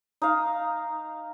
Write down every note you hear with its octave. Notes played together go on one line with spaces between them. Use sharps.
D#4 F5